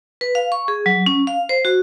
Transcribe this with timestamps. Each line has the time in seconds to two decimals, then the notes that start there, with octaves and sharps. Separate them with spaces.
0.21 B4
0.35 F5
0.52 C#6
0.68 G#4
0.86 F#3
1.06 C#4
1.27 F5
1.49 C5
1.65 F#4